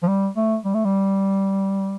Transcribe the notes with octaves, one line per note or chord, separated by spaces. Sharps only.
F3
G3
A3
G3
A3
G3